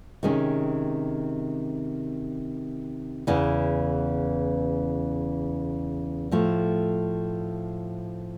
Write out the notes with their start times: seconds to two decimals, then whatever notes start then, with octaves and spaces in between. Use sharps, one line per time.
0.23 C3 D#3 G#3 C#4
3.27 E2 C#3 E3
6.31 A2 F3 A3